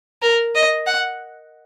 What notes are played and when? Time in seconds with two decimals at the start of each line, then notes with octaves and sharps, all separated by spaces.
0.22 A#4
0.55 D#5
0.87 F#5